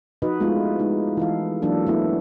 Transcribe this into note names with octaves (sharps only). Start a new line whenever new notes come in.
F3 D#4 F#4 B4 D#5
G#3 A3 B3 E4 F4
G#3 D#4
E3 A4 F5
E3 F#3 A#3 D4 A4
A3 B3 E4